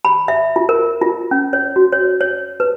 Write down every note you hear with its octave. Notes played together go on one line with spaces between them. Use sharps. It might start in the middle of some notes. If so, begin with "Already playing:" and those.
B5
E5
F4
A#4
F4
C#4
C#5
F#4
C#5
C#5
B4